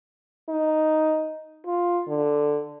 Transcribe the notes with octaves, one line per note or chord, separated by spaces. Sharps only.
D#4
F4
D3